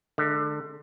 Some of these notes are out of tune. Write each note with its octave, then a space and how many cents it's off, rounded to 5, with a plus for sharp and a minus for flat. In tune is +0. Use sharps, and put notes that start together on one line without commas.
D3 +25 G#3 +45